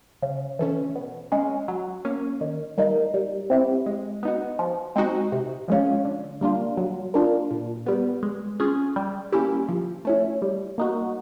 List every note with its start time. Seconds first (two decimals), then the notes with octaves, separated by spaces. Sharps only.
0.22 C#3
0.59 E3 A3 C#4
0.96 B2
1.32 G#3 C#4
1.68 F#3
2.05 A#3 C#4
2.41 D#3
2.78 G3 A#3 D#4
3.14 G3
3.50 C4 E4 G4
3.86 G#3
4.23 B3 D#4 F#4
4.59 F3
4.96 G#3 C4 D#4 F#4
5.32 C3
5.68 F3 G#3 C#4 F4
6.05 D3
6.41 G3 A#3 D4 F4
6.77 F#3
7.14 A#3 D4 F4
7.50 A#2
7.86 G3 B3
8.23 G#3
8.60 C#4 F4 G#4
8.96 G3
9.32 A#3 C#4 E4 G4
9.69 F3
10.05 A3 C#4 E4
10.42 G3
10.78 A#3 D#4 F#4